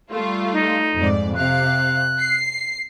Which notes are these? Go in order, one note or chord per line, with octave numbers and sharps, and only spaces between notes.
G3 A3 F4
D#4
F2 G#2 D5
C3 F5 F#6
C7